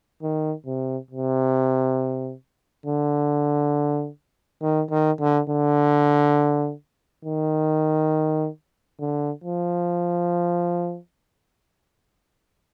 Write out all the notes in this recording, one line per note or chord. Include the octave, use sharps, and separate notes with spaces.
D#3
C3
C3
D3
D#3
D#3
D3
D3
D#3
D3
F3